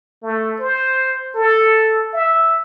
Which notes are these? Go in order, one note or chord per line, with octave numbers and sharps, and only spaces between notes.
A3
C5
A4
E5